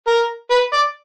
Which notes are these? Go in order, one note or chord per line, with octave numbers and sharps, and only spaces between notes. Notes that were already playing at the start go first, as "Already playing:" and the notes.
A#4
B4
D5